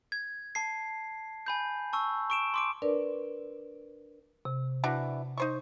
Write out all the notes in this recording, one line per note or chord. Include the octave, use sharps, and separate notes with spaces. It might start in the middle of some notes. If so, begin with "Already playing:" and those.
G#6
A5 C7
G#5 B5 G6
A5 C#6 E6
C#6 D7 E7
C6 D6 D7
D4 A#4 B4 D5
C3
E3 D4 F#4
D#4 C5 C#6